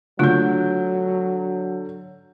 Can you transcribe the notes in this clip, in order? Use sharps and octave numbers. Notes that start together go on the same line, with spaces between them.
D3 F#3 A3 F4 G6